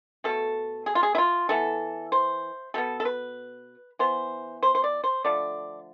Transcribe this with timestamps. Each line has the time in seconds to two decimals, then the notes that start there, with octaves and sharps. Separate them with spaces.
0.24 B2 A3 A4
0.86 G#4
0.95 F4
1.03 G#4
1.15 E4
1.18 F4
1.49 E3 B3 A4
2.12 C5
2.74 B2 B3 A4
3.00 A4
3.05 B4
3.99 E3 B3 C5
4.63 C5
4.75 C5
4.84 D5
5.04 C5
5.25 D3 F3 A3 D5